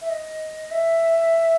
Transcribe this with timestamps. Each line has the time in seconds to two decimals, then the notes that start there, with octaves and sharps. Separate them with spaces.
0.01 E5
0.10 D#5
0.71 E5